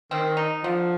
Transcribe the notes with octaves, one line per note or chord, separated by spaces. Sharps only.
D#3 C4
D#4
D3 F3